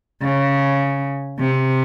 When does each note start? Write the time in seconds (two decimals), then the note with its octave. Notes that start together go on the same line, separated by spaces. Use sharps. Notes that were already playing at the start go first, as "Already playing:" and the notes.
0.22 C#3
1.39 C3